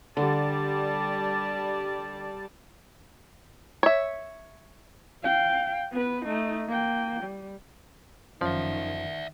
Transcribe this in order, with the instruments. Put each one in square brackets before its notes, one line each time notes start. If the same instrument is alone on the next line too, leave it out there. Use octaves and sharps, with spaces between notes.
[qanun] D3 [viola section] G3 D5 A5
[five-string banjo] C#5 E5
[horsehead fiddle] F5 G5
B3 B4
A3 D#4
A#3 G5
G3
[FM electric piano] G1 F#2 C#4 [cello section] D#3 [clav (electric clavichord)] F3 [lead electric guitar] D5 E5